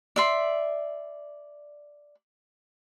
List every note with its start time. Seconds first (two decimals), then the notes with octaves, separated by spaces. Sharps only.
0.16 D5 E5 C6